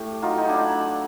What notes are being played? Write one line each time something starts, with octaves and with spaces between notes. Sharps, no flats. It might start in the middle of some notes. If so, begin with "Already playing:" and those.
Already playing: A2 A3 G4
F#3 D#4 F4
D#4
D4 E4